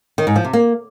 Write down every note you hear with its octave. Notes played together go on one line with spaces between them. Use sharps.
D#3
G#2
F3
C3
A#3